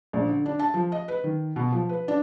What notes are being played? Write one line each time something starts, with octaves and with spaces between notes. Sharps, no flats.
A#1
D3
D4
A5
F3
D#5
B4
D#3
B2
F3
B4
D4